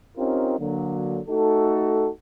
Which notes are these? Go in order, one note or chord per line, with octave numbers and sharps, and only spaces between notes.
C4 C#4 D#4 F4 G4 A#4
D3 F#3 A#3
A3 D#4 F#4 A4